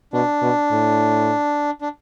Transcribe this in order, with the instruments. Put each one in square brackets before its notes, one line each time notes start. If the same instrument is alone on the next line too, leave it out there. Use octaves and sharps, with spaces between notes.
[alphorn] B2 [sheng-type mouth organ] D4
[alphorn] B2
A2
[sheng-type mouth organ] D4